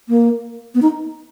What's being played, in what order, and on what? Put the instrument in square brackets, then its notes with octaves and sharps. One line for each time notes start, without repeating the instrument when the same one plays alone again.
[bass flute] A#3
B3
D#4